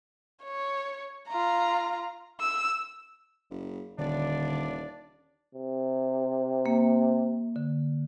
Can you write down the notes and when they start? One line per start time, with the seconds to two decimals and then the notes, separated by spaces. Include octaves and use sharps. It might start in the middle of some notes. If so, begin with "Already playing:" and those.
0.44 C#5
1.28 F4 A#5
2.40 E6
3.50 F#1
3.98 D#1 D3 D4 D5
5.55 C3
6.66 A#3
7.56 D3